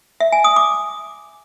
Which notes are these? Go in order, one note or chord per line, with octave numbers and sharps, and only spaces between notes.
E5
G#5
D#6
D6